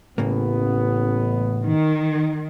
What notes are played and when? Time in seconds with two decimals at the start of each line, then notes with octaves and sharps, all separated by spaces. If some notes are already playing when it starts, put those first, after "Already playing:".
0.18 A1 A2 C#3 A#3 B3
1.64 D#3